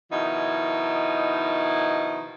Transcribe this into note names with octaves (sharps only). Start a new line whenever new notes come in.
B2 D#3 F3 D#4 E4